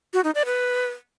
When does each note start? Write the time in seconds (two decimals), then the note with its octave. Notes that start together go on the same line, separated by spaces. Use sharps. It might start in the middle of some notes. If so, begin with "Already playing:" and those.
0.13 F#4
0.24 D#4
0.35 D5
0.46 B4